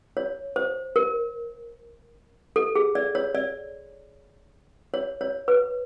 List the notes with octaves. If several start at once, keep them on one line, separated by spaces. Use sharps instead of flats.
C#5
C5
A#4
A4
G#4
D5
C#5
D5
C#5
C#5
B4